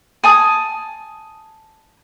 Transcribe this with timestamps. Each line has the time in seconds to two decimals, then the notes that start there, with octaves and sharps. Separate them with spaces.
0.24 G#5 A5 D#6